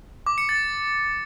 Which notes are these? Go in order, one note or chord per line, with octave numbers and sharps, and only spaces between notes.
D6
C#7
A6